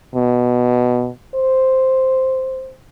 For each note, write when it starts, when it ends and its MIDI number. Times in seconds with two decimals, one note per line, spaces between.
0.15 1.10 47
1.34 2.74 72